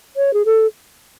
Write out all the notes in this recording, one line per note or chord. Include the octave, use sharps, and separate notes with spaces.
C#5
G#4
A4